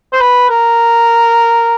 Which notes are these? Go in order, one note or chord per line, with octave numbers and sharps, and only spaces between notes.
C5
B4
A#4